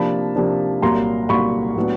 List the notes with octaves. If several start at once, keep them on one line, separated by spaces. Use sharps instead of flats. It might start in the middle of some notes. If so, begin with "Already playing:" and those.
Already playing: C3 F3 A#3 D4 A5 B5
C3 F3 A#3 D4
C2 A#2 F#3 A#3 A#5 C6
C2 A#2 F#3 A#3 B5 C#6
A2 F#3 B3 D4